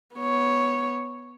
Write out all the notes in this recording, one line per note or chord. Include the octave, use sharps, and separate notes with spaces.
B3 C#5